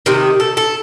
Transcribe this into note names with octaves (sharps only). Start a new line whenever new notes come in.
C3 D#3
A4
A4